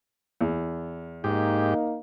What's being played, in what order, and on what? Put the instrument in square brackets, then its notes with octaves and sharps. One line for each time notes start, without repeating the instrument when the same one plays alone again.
[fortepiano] E2
[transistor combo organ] G#2 G4 [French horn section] A#3 D#4